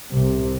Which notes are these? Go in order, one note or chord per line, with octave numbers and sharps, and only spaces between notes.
C2 C3